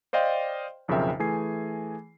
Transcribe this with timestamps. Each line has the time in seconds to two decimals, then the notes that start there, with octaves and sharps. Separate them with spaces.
0.13 C5 D5 D#5 F5 G5 C6
0.88 B1 F2 C#3 A#4 E5 G5
1.19 E3 A3 G#4 G#5 C7